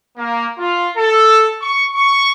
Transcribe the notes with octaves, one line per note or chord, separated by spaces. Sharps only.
A#3
F4
A4
C#6
C#6